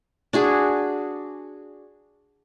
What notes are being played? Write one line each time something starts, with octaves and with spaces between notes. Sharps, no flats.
D4 F#4 G#4